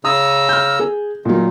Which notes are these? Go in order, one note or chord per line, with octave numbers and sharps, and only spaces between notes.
C#3 A#5 D#6 E6
F6 G6
G#4
A#2 D#3 F#3